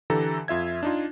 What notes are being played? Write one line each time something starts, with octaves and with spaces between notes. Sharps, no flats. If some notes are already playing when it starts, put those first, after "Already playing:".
D3 E3 G4 A4 A#5
F2 F4 E5 G#6
D4 D#4 F4